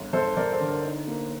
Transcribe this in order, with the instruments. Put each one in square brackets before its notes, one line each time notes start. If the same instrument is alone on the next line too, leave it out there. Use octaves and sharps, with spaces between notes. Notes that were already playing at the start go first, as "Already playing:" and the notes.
Already playing: [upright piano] G1
G1 A4 C5
G1 A#4 D5
A4 C5
D3
A#4
D#4
A#3